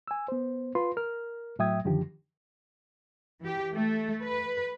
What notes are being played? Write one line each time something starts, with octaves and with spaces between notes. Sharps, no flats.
G#5 E6
B3 C5
F4 B4 C6
A#4 F6
A2 F#3 E5 G5 D#6 G#6
F#2 D3 D#3 F3 G4
E3 G4
A3
B4